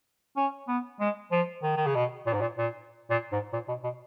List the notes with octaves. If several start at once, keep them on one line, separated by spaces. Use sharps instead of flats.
C#4
B3
G#3
F3
D#3
D#3
C#3
B2
A#2
G#2
A#2
A#2
A#2
G#2
A#2
B2
B2